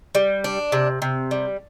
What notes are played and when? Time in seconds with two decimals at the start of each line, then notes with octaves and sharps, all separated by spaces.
0.15 G3
0.44 D4
0.72 C3
1.02 C3
1.31 G3